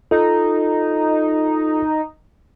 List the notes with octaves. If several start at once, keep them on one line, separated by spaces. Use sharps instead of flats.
D#4 F4 A4